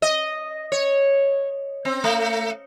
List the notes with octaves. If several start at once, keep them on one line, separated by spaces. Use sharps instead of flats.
D#5
C#5
C4
A3